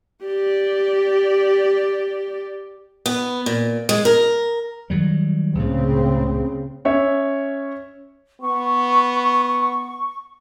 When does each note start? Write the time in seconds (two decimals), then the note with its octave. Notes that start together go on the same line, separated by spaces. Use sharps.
0.25 G4 D5
3.06 B3
3.46 A#2
3.89 G#3
4.05 A#4
4.90 D#3 F#3 G3
5.55 C#2 A2 C#3 C4
6.85 C#4 C#5 E5
8.41 B3 C#6